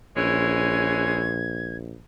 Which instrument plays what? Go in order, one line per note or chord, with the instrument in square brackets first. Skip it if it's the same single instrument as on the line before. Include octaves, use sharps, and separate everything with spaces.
[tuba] A#1 [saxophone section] E3 G#3 C#4 [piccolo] G#6